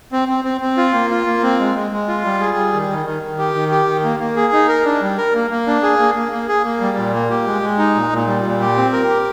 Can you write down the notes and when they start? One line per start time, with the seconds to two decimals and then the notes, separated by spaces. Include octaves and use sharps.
0.12 C4
0.29 C4
0.44 C4
0.61 C4
0.77 F4
0.94 A#3
1.10 F4
1.26 A#3
1.43 C4
1.59 G#3
1.75 G#3
1.91 G#3
2.08 F4
2.24 G3
2.40 G#4
2.56 G3
2.73 D#3
2.89 D#3
3.06 D#3
3.22 D#3
3.38 G4
3.55 D#3
3.71 G4
3.87 D#3
4.04 A#3
4.20 A#3
4.36 G#4
4.53 D#4
4.68 A#4
4.85 D4
5.02 G3
5.18 A#4
5.34 A#3
5.50 A#3
5.67 D4
5.83 G#4
5.99 A#3
6.15 A#3
6.32 A#3
6.48 G#4
6.64 A#3
6.80 G3
6.97 A#2
7.14 A#3
7.30 G4
7.46 G#3
7.62 G#3
7.78 D#4
7.95 A#2
8.11 A#2
8.27 G3
8.44 A#2
8.60 G4
8.77 C4
8.92 A#4
9.09 G4